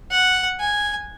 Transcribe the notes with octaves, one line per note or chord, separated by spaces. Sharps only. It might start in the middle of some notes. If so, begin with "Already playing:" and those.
F#5
G#5